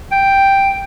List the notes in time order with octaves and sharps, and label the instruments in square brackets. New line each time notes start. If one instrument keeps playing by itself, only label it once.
[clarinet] G5